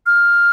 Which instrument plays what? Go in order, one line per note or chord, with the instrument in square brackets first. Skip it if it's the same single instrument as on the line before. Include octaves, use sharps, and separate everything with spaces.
[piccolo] F6